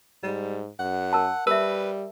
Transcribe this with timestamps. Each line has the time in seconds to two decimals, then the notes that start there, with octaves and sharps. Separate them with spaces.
0.23 G#2 G3
0.80 F#2 F#5
1.13 A#4 A5
1.47 G3 A#4 B4 E5